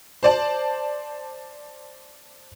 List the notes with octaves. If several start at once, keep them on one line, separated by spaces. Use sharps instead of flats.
C5 D5 A5